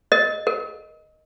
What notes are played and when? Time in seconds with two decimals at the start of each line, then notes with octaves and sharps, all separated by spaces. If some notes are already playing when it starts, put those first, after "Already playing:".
0.12 A#4 D#5
0.47 A#4